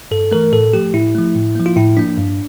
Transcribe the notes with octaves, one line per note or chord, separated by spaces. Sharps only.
G2 A4
E3 A3 A#4
A2 A4
F3 A3 G4
A2 E4
F3 A3
A2
F3 A#3
F4
A2 E4
F3 A#3 D4
G2